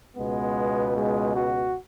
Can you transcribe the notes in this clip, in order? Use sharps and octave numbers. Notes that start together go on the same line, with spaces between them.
C#2 B2 G#3 B3
G#3
F#4